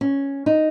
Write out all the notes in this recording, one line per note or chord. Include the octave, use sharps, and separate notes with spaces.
C#4
D#4